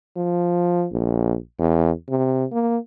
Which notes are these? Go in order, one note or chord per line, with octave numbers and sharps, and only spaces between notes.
F3
A#1
E2
C3
A#3